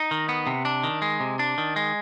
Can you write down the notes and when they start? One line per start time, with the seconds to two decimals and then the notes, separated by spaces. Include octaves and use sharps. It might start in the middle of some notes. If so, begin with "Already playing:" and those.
Already playing: D#4
0.11 D#3
0.29 B3
0.47 C3
0.65 D4
0.84 D#3
1.02 G#3
1.20 C3
1.39 D4
1.58 D#3
1.76 G#3